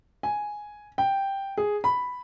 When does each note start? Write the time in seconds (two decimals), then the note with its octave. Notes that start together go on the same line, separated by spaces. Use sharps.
0.23 G#5
0.98 G5
1.58 G#4
1.84 B5